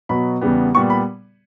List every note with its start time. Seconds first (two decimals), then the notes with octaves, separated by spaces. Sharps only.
0.09 B2 F#3 B3 B5
0.41 E2 C#3 G3 B3
0.75 A#2 G3 B3 C#6
0.90 B5